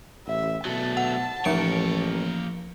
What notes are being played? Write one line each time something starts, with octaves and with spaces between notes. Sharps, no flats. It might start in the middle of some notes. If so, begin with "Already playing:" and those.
A1 E5
B2 F#3 A3 A5
F#5
A1 F3 A#3 C#5 C#7 D7